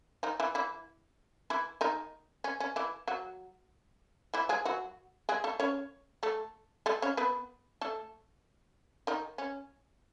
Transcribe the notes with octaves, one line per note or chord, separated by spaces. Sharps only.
D#3 D#4
E3 E4
E3 E4
E3 E4
D#3 D#4
C#4
C#4
E3 E4
F#3 F#4
E3 E4
G#3 G#4
F#3 F#4
G#3 G#4
A3 A4
C#4 C#5
A3 A4
A3 A4
C#4 C#5
B3 B4
A3 A4
D#3 D#4
C#4